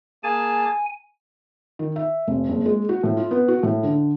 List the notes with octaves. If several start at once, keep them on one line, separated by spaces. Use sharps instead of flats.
A#3 G#4 G#5 A5
D#3
E5
F1
F#1
G#3
F#4
A2
F4
B3
F#4
A2
D3